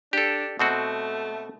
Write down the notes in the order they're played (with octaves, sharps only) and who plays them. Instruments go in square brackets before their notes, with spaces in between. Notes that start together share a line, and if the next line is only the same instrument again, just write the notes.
[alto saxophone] D4 [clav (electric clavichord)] G4 A4
[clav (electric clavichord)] B2 C4 F#4 [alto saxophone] A3